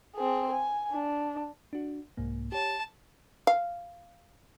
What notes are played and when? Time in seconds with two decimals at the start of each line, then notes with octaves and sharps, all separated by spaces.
0.15 C4 G#4
0.51 G#5
0.92 D4
1.73 D4 F#4
2.17 C2 G#2 A#3
2.52 G4 C#5 A5
3.47 F5